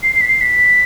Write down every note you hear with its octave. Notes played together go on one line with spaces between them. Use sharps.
C7
C7
B6
C7
B6